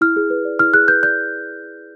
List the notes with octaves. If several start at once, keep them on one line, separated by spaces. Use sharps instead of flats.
E4 F6
G#4
B4
D5
E4 F6
G#4 F#6
B4 G6
D5 G6